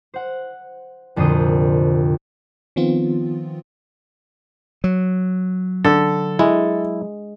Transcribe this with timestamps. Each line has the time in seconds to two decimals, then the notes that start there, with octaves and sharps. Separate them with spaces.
0.14 C5 F#5
1.16 C2 F2 A#2 D3 C5 D#6
2.76 D#3 F3 B3 C4 F4
4.84 F#3
5.84 D3 A4
6.39 G#3 E4